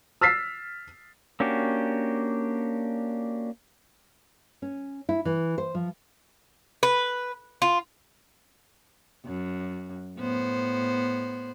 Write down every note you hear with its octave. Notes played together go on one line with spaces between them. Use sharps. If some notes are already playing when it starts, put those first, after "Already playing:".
E6 F6 A6 B6 C7
A#3 C#4 D4 F#4 G4
C#4
E4
E3
C5
F3
B4
F4
F#2
A2 B3 C5